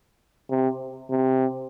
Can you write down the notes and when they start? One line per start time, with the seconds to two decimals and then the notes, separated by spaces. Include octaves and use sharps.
0.50 C3
1.10 C3